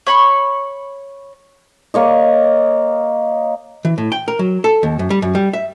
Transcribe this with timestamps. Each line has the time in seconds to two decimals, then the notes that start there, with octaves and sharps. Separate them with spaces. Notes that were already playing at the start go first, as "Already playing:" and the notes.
0.07 C#5 B5 C#6
1.94 A#3 C#5 D#5
3.85 E3
3.98 A2
4.12 G5
4.28 A#4
4.39 F#3
4.64 A4
4.83 D#2
4.99 F#2
5.10 G3
5.22 F#2
5.35 G3
5.53 E5